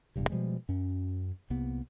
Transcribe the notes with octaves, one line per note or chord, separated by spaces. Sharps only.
E1 G2 C3
B2 F3 G3 G#3
F#2 C#4
C2 C3 A#3 B3